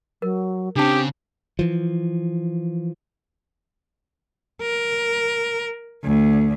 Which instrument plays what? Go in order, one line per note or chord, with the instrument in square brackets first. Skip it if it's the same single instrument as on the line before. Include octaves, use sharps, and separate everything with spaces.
[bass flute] F#3 [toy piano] A#4
[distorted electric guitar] C#3 [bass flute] C4 [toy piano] D4 A5 [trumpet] G4
[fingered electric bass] E3 F3
[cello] A#4
D2